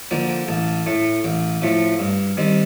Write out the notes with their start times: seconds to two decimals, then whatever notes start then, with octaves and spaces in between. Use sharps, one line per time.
0.11 D3 F3 A#3 G5
0.29 G5
0.48 A1 A5
0.86 A2 A3
1.24 A1 G5
1.62 A2 F3 A3
1.99 G2
2.37 D#3 G3 C4